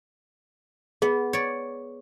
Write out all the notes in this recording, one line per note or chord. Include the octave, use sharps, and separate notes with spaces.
B3 G#4
C#5 D5